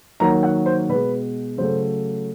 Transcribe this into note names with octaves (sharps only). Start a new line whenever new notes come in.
D#3 F#3 A#3 A#5
F#5
C5
B2 G#3 B3 B4
C#3 F#3 A3 C5